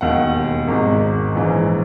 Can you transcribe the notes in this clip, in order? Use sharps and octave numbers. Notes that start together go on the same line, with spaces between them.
E1 D#2 D#3 F#5
G#1 G#2 D#3
A#1 G#2 E3